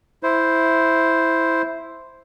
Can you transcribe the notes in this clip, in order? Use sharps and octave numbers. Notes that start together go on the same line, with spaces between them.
E4 C5